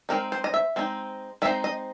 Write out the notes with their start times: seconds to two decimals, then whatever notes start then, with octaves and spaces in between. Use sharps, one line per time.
0.09 G#3 C4 D#4 A#4
0.32 C5
0.44 D#5
0.54 E5
0.76 G#3 C4 D#4
1.42 G#3 C4 D#4 E5
1.64 D#5